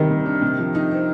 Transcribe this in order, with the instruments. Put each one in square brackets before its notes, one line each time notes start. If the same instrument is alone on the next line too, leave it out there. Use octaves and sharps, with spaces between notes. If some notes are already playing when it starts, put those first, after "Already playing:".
Already playing: [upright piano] C3 G3 [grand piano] D#3
[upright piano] C3
D4
C3
F3
D#4
C4